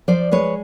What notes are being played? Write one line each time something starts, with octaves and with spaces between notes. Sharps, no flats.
F3 C5 D5
G#3 B4 C#5